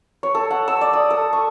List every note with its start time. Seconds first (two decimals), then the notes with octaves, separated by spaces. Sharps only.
0.23 C#5
0.35 A4
0.51 F#5
0.68 E6
0.81 D5
0.93 D#6
1.10 A4
1.33 C#6